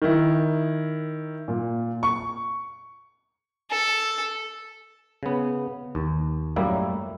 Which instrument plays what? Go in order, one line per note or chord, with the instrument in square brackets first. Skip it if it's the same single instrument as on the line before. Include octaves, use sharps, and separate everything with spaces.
[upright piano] D#3 E4
A#2
C#6
[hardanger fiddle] A4
[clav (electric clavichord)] C#3 B3
D#2
F#2 A2 G3 A#3 E4